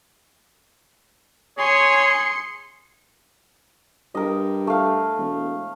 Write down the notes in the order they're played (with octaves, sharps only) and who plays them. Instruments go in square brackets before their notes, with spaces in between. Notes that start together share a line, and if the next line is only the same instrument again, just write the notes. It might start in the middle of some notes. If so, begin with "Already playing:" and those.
[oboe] G#4 [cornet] C#5 [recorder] G#5 [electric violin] C6 C#7
[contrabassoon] G2 [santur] A#4 D#5
[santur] A3 F5
[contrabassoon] E1